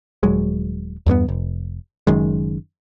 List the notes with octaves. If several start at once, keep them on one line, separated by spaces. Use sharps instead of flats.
D#1 F#3 G#3
E2 G2 A#3 B3
F1
F#1 F#2 D#3 G#3